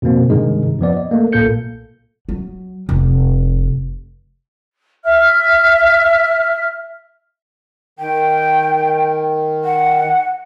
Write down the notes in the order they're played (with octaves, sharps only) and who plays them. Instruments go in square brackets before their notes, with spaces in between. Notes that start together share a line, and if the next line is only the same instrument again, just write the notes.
[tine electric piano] F2 B2 D3 A#3 C4
G2 C3 D#3 G#3 D#4
F2 F3 B3 D5
D#5
A3 A#3
B1 A#2 A#3 A4 G6 C#7
[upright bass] F#3
F1
[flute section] E5 F6
[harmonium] D#3 [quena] G5
[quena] F#5